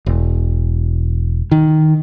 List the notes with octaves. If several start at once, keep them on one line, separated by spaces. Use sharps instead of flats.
E1
D#3